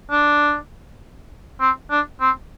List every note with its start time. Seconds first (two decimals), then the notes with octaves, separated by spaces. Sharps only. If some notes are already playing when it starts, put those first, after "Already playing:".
0.11 D4
1.61 C4
1.91 D4
2.21 C4